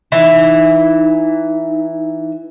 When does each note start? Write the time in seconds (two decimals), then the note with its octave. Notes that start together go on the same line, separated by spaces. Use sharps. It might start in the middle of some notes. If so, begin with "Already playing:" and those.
0.12 E3 D#4